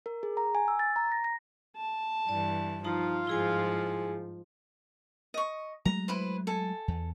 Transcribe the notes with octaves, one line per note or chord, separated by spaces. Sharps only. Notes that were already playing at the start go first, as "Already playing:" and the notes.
A#4
G#4
A#5
G#5
E6
A6
A#5
A#6
A#6
A5
G2 E3 D5
F3 D#4 F4 A5 A#5
G#2 F3 E4 G#4 G#5
D#5 C#6
F#3 G#3 A3 A#5
E4 B4 C5
A4 G#5
E2